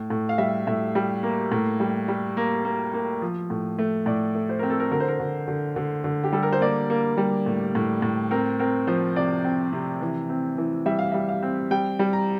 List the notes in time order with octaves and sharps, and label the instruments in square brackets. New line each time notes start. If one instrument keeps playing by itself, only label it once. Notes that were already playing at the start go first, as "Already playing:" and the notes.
Already playing: [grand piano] A2
A2
F5
G3 E5
A2 E5
G3
A#3
A2
G3
G3
A#3
A#3
A#3
F3
A2
A3
A2 D5
A3
C5
C4 A#4
A4
A#4
D3 A#4
C5
A#4
D3
D3
D3
D3
G4
G3 A4
A#4
C5
A#3 D5
A#3
G3
A2
A2
A2
C4 A#4
C4 A#4
F3 C5
C3 D5
C4
C3
E3
C4
E3
G3 E5
F5
G3 E5
F5
C4
G3 G5
G3
A#5